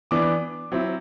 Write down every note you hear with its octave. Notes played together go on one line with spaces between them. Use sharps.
E3 B3 D4 D6
F#3 C4 E4